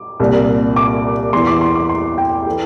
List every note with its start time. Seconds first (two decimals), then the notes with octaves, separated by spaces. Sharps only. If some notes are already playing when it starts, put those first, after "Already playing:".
Already playing: D6
0.20 C2 A#2
0.76 D6
1.33 E2 E3 C6
1.47 D6
1.61 C6
1.75 D6
1.89 C6
2.18 G5
2.46 E3 A4